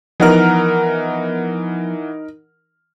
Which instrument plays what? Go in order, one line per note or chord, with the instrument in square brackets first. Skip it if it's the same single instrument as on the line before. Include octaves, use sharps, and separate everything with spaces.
[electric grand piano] E3 F#5 F6 [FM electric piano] F3 B3 [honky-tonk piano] D#4 A#4